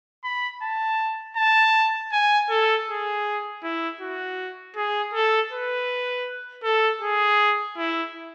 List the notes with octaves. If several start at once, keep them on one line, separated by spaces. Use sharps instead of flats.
B5
A5
A5
G#5
A4
G#4
E4
F#4
G#4
A4
B4
A4
G#4
E4